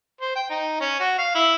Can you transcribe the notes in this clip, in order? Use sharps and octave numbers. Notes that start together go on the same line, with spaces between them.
C5
G5
D#4
C#4
F#4
F5
E4